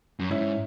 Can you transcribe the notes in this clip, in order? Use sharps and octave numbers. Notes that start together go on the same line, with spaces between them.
F#2
G#2 C#4 E4